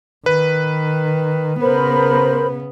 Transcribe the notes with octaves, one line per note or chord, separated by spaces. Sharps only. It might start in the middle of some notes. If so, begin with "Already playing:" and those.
D#3 B4
C#3 B3 A#4 C5 B5